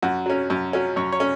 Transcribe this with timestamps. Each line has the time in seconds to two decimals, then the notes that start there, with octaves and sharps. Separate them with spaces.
0.02 F#2 F#4
0.26 F#3 C#4
0.50 F#2
0.73 F#3 C#4
0.96 F#2 C#5
1.12 C#5
1.20 C#4